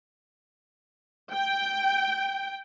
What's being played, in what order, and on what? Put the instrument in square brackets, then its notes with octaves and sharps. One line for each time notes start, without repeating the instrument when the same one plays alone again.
[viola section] G5